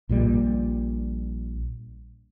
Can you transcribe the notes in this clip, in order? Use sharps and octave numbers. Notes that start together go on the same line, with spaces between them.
A#1 A#2 D3 G3